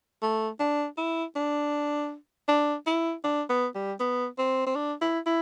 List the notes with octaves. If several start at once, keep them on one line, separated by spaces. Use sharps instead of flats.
A3
D4
E4
D4
D4
E4
D4
B3
G3
B3
C4
C4
D4
E4
E4